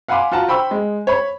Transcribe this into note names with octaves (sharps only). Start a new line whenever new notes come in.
F5 F#5 G#5 B5 C6 D6
F4 F#4 F#5 A5 A#5
C5 G5 B5 C#6 E6
G#3
C#5 B5